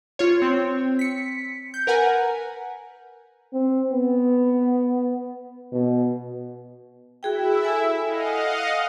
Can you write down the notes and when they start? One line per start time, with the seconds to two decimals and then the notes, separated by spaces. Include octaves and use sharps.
0.19 F4 C#5
0.42 C4
0.99 B6 C#7
1.74 G6
1.87 A#4 B4 F#5 G#5 A#5
3.53 C4
3.92 B3
5.72 B2
7.23 E4 F#4 G#4 E5 G5
7.63 A4 G#5
8.03 D#5 F5 F#5